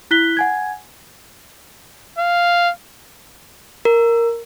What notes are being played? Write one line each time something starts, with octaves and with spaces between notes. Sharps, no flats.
E4 F#6 B6 G7
F#5 G#5 G#6
F5
A#4